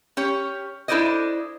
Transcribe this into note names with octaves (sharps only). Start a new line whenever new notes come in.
C#4 G4 C#5
D4 E4 A4 C5 D5 D#5